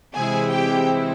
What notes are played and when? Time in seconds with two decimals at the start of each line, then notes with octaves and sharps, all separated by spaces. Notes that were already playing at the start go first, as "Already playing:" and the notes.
0.16 C3 E3 G#3 C4 E4 G#4 G#5
0.50 G4 G5